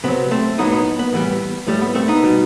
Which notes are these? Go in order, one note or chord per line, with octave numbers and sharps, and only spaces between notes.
C3 F#3 B3
A3 C4
A2 F#3 B3 D#4
B3 D#4
B3
A2 E3 G3 B3
A2 G3 A3
B3
A3 C4
B3 D#4
B2 G3